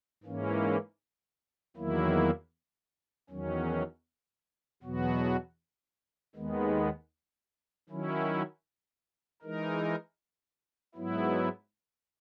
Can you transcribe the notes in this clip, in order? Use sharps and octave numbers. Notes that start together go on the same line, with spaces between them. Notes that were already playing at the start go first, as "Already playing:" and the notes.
G#2 E3 A#3 C#4
E2 D#3 F#3 A#3 E4
E2 D#3 F#3 C#4
E2 B2 F#3 B3 F#4
D#2 D#3 G#3 B3
D#3 F#3 C#4 E4
E3 G#3 D#4 A#4
G#2 F#3 B3 E4